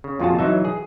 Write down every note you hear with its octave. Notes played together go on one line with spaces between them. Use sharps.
C#3
F2 A#2 F4 F#4 G#4 A5
E3 F#3 D#4 E5
G#4